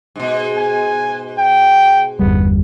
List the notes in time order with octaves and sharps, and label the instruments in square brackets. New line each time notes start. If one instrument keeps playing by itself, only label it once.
[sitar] G#2 B2
[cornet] G#5
G5
[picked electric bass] G1 E2 G3 [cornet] B3